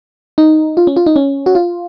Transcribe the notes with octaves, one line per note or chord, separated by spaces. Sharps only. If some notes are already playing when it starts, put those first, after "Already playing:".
D#4
F4
C#4
F4
D#4
C#4
F#4
F4